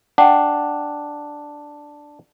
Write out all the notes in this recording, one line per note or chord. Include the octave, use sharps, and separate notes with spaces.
D4 F#5 G5